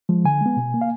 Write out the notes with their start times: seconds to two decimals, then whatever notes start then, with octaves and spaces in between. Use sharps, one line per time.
0.09 F3 G#3
0.24 D3 G#5
0.41 G#3 B3
0.57 B2
0.74 A#3
0.81 F5